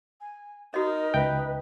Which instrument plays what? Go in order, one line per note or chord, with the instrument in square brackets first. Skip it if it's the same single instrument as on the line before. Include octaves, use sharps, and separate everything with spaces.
[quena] G#5
[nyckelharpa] D#4 [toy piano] F#4 D#5 [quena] A#4
[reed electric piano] C#2 G5 [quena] B4 [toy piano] E5